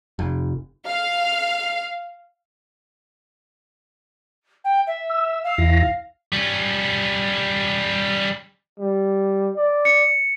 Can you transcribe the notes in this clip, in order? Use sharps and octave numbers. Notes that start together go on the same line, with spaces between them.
F1
F5
G5
E5
E6
F5
E2 E4 A#6
G3 C#4
G3
D5
C#7